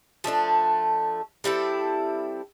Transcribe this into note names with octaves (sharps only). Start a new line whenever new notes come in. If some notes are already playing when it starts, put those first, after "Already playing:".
F3 A3 D4 A4
G3 C4 E4 A4